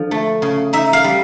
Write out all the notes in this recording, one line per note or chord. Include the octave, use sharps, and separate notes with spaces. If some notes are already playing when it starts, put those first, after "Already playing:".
Already playing: D3 F3
A3
C#3
D#4 E5
F5
G3